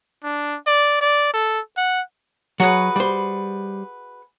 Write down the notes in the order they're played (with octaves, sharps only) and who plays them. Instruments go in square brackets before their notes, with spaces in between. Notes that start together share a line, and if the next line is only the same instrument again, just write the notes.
[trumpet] D4
D5
D5
A4
F#5
[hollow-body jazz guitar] F#3 [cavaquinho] F#4 G#4 B4
[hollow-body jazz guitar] G3 C5